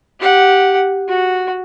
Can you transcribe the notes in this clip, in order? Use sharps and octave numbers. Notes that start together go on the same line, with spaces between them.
G4 F#5
F#4